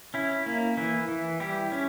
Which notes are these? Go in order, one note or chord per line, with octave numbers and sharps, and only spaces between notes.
C#4 E4
A#3
E3 E4
E3
G3 E4 G4
C#4